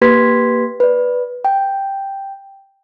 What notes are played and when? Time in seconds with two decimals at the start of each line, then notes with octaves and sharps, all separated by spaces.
0.02 A#3 G4 B4 C6 G#6 B6
0.80 B4 D5
1.45 G5